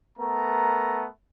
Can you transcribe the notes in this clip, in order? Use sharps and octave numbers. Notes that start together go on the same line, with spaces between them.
A3 B3 A#4 A#5